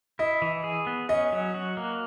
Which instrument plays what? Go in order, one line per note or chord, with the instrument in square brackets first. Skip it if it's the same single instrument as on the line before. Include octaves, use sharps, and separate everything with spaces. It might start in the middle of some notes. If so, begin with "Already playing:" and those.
[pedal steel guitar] E4 [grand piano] D#5
[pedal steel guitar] E3
G#4
B3
[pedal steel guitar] C#4 [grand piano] D#5
[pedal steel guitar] F#3
F#4
A#3